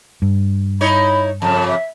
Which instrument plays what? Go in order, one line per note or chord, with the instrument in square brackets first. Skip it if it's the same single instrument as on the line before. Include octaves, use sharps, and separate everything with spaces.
[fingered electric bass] G2
[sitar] D#4 E4 C#5 [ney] B5
[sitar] F2 C#3 [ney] A5
[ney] E5